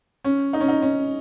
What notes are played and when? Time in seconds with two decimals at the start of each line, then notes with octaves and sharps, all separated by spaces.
0.24 C#4
0.53 D#4
0.61 C#4
0.68 D#4
0.82 C#4